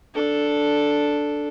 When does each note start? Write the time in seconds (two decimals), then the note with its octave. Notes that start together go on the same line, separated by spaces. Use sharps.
0.15 D4 A4